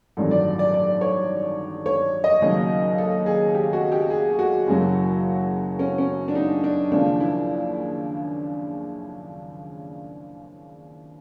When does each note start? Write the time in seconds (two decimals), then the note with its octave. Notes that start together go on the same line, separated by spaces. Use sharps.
0.17 A1 G2 D#3 F#3 A4
0.31 D5
0.59 D5
0.74 D5
1.01 C#5
1.86 C#5
2.24 D#5
2.42 D#2 C#3 F#3
2.98 A4
3.26 G#4
3.54 G4
3.73 F#4
3.92 G4
4.10 G#4
4.39 F#4
4.67 F#1 F#2 C#3 F#3
5.79 C#4
5.98 C#4
6.28 D4
6.35 D#4
6.64 D4
6.91 D#2 C#3 F3 D4
7.20 E4